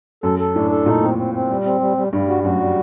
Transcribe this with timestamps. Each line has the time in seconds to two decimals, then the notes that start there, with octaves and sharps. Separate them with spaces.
0.23 F#2 A4
0.39 A4
0.55 A2 D4
0.71 A4
0.86 A#2 D#4
1.02 C4
1.18 C4
1.34 C4
1.49 G3
1.65 C4
1.81 G3
1.97 G3
2.13 G2 G3
2.29 F#4
2.44 F#2 F#4
2.60 G3